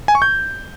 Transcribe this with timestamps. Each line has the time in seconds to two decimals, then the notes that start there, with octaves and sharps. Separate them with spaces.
0.08 G#5
0.15 C#6
0.22 G6